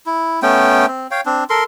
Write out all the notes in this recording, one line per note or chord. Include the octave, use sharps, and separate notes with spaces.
E4
A3 B3 C#4 G5
C4
C#5 F5 G5
C4 D4
A4 A#4 C6